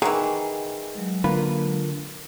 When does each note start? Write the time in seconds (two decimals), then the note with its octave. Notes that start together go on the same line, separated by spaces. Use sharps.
0.02 D#3 E3 G#4
0.95 F#3 G#3
1.24 D3 A#3 F4 B4